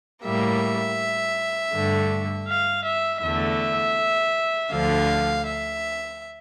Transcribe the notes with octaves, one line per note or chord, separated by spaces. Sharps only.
A2 G3 A#3 E5
G2 D3 A3
F5
E5
E2 D3 A3 E5
D2 D3 F3 F5
E5